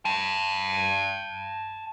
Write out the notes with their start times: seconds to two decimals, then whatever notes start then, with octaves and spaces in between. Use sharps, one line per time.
0.05 G5 A5